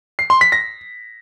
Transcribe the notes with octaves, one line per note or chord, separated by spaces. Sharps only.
C7
C6
B6
A#6